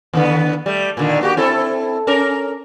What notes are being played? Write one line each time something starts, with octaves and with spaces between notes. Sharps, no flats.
D#2 D3 B3
G3 A3
A#2 D3 D#3
A#3 F#4 G4
C4 E4 A4
C#4 A#4